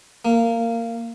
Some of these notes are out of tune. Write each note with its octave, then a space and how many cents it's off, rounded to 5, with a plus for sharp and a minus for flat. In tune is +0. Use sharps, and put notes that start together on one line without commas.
A#3 -15